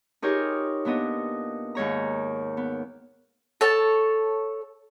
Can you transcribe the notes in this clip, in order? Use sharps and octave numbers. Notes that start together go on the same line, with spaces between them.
D#4 F4 G4 G#4 A#4 C#5
A#2 B3 D4 D#5
D#2 G#2 C#5 A#5
B3
A4 C#5 A5